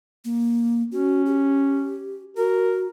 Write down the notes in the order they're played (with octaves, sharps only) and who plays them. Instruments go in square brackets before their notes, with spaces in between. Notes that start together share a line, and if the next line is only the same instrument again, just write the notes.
[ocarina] A#3
[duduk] C#4 [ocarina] F#4
[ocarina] G4
[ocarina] F#4 [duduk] A#4